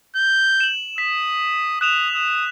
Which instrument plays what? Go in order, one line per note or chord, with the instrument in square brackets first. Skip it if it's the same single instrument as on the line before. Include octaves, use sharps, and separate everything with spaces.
[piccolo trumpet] G6
[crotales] E7 F#7
[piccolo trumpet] D#6 [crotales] B6
[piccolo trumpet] D#6 [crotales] F#6 E7 F7
[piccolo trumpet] D#6